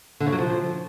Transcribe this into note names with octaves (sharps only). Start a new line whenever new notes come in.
D3
C#3
F#3
F3